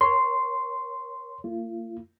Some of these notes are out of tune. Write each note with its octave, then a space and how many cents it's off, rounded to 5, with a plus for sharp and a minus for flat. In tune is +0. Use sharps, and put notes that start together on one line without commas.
A#4 +30 C#5 +0 C6 -10
A#3 -40 F4 -35